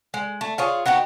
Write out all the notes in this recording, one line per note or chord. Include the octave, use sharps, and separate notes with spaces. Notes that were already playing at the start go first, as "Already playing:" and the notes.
G#3
A3
F4 G#4 C#5
B3 D#4 F#4 G4